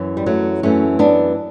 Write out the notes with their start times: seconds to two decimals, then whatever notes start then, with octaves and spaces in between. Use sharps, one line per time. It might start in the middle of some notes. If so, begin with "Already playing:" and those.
Already playing: F#2 E3
0.17 G3
0.26 F#3 A3
0.63 F#2 E3 A3 C#4
0.99 B3 D4